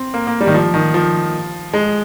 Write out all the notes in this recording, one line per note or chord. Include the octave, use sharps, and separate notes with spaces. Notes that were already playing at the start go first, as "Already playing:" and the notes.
Already playing: C4
A#3
A#3
G3
D#3
F3
D#3
F3
G#3